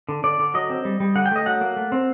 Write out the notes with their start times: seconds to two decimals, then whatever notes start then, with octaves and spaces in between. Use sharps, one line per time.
0.09 D3
0.24 D3 D5
0.39 D3
0.54 F#3 D#5
0.70 C4
0.85 G3
1.00 G3
1.15 D3 F#5
1.26 G5
1.31 A3 D#5
1.46 F#3 F#5
1.61 A#3
1.77 A3
1.92 C4